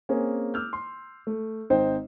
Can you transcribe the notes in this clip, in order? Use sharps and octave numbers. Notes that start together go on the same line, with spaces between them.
A#3 C4 C#4 G#4
D6 E6 F6 G6
C6
A3
G#1 C4 D#4 C5 D#5 G5